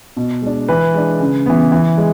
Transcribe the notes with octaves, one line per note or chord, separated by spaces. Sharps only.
B2
G#3 D4
E3 B4
G#3 D4
C#3
E3 B3
E3
G#3